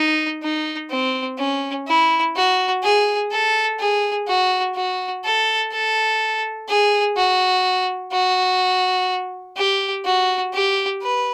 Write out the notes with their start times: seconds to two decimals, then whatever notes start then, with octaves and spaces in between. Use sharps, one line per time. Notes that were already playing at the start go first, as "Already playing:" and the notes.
Already playing: D#4
0.43 D#4
0.90 C4
1.38 C#4
1.87 E4
2.36 F#4
2.83 G#4
3.31 A4
3.79 G#4
4.27 F#4
4.76 F#4
5.25 A4
5.72 A4
6.68 G#4
7.17 F#4
8.12 F#4
9.57 G4
10.05 F#4
10.53 G4
11.02 B4